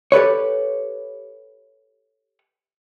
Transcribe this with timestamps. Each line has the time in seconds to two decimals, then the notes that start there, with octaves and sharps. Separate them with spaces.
0.12 G4 A4 B4 C#5